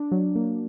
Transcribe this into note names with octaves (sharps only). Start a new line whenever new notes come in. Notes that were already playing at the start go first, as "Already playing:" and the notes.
Already playing: D4
F#3
A#3